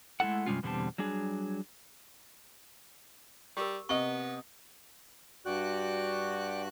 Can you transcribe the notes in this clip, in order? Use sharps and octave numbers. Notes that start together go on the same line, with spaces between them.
G#3 A3 E4 A4 F#5
G2 C3 G3 G#3 C#4 F4
E2 B2 D3 G3 C4 A5
F#3 G3 D4 G#4
G3 G4 A#4
C3 B3 D#5 C#6
G2 F#4 D5 G5 F#6